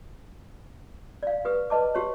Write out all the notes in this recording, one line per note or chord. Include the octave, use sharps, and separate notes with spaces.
D5 F5
G4 B4 D#6
B4 D#5 A5 D6
F#4 G4 C#5